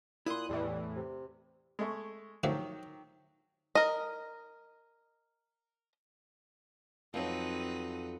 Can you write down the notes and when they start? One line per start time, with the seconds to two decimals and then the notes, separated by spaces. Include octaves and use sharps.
0.26 A#2 E4 C6 D#6 F#6
0.49 E2 A2 E3 G3
0.96 C3
1.79 G#3 A3 C#6
2.44 D3 D#3 F3 F#3 A3 G4
3.75 A#4 D#5
7.14 F2 F#3 C4 D#4 B4